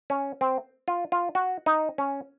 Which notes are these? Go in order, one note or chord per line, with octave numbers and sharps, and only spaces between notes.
C#4
C4
F4
F4
F#4
D#4
C#4